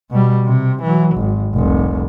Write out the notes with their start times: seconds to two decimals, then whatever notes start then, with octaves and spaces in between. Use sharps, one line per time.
0.11 B2 G3
0.45 C3
0.82 E3 F#3
1.16 G#1
1.55 F1 C2